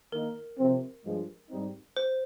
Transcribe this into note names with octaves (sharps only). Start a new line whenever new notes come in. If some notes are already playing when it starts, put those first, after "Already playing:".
D#3 A#3 D#4 A#4
C3 F3 C4
G2 F3 G#3
G#2 G3 C4 D#4
C5